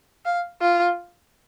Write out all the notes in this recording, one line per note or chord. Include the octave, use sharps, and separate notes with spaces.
F5
F4